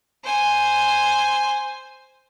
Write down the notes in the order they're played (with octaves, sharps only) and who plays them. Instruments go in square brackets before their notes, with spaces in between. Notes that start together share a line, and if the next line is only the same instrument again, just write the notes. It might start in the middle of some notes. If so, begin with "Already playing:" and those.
[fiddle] C5 G#5